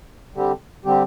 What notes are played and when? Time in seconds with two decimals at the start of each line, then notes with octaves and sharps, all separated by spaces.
0.34 D3 G3 C4 G4
0.85 D3 G3 C4 G4